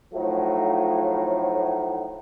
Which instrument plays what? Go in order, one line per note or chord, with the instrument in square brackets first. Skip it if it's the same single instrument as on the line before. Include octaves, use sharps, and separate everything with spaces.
[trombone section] A2 F3 F#3 A3 D#4 F#4